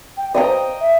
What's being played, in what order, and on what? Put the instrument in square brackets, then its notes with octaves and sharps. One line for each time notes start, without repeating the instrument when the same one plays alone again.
[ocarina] G5
[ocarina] B4 [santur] D#5 G5 A#5
[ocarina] C5
E5